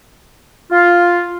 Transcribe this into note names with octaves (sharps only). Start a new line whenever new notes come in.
F4